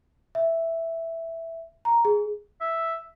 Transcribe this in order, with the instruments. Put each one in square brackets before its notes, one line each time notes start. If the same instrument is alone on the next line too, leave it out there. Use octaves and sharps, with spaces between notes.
[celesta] E5
A#5
G#4
[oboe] E5